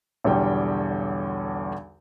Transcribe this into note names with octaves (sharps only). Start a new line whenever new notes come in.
B1 E2 D3 G3 G5